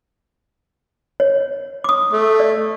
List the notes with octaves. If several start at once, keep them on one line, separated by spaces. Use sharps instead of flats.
C#5
D6 D#6
A3
D5